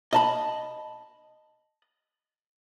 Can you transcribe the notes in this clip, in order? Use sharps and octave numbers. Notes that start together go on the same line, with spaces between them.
D#5 A5 B5